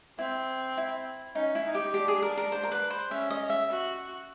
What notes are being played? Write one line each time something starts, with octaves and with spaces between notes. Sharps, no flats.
C4 E4
E4
C#4 D#4
E4
D#4
G4
D4 G4
G#4
A#4
A#4
C5
A#4
B4
C5
C#4 E5
D#5
E5
F#4